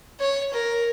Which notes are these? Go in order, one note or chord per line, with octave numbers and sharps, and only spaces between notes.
C#5
A#4